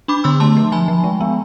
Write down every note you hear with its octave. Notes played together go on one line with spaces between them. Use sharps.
D4 B5 D6
D3 C6 E6
A3 A5 C6
F3
F3 G#5 B5
F3
G#3
B3